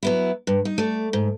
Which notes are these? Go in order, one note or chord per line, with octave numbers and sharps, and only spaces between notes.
F#3 B3 E4
G2
D#4
A3 D5
G#2